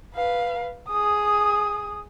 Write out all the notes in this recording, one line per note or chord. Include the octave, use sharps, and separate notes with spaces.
B4 F5
G#4 D#6